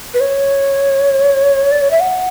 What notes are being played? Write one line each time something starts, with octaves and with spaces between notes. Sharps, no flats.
B4
C#5
D5
C#5
E5
F#5